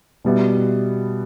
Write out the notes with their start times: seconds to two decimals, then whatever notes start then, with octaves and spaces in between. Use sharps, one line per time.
0.25 B2 G3 B3 E4